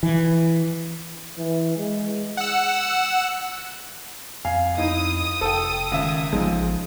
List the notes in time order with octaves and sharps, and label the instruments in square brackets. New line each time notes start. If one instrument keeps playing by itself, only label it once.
[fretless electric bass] E3
[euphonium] E3
G#3
[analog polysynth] F#5 E6
[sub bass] F2 [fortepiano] F5 [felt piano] G#5
[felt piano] D#4 E4 [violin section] D#6
[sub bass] F1 [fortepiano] A4 G5
[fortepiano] C#2 E5 [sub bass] D#3
[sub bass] A1 [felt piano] F3 G#3 D#4